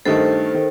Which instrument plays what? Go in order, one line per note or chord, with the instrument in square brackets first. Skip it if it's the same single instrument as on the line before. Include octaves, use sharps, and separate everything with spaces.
[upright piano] G2 D#3 A3 D#4 [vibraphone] A4 C5
[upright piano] D#3